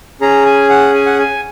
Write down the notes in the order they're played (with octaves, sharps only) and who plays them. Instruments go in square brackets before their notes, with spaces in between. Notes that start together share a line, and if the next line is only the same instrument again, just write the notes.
[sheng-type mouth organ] C#4 G#4 A#5
G#5
F#5
G#5
F#5
G#5